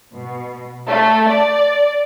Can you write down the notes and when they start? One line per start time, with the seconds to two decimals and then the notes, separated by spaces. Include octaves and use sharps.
0.15 B2
0.87 A3
1.29 D5